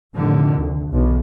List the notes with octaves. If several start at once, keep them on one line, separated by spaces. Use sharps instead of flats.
F1 A2 D3 D#3
D2
B1 E2